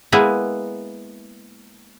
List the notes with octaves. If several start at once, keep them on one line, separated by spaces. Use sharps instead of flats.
G#3 A#3 B3 E4